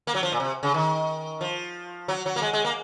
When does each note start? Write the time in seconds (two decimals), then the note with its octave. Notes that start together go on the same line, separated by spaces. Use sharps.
0.07 A#3
0.15 F#3
0.23 F3
0.32 A#2
0.40 C3
0.63 C#3
0.74 D#3
1.41 F3
2.08 F#3
2.26 F#3
2.36 A#3
2.42 G#3
2.53 G#3
2.65 A#3